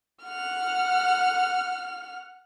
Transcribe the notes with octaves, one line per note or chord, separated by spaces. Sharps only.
F#5 F6